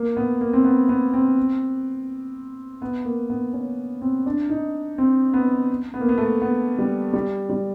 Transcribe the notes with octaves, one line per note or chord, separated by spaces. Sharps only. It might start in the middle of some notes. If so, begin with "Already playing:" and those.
Already playing: A#3
B3
A#3
C4
B3
B3
C4
B3
A#3
B3
C#4
C4
D4
D#4
C4
B3
B3
A#3
B3
A3
B3
G3
G3
G3